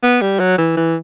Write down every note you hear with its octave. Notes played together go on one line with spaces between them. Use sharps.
B3
G3
F#3
E3
E3